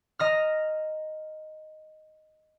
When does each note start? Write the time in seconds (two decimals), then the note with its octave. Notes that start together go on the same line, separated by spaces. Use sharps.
0.19 D#5 A#5 F6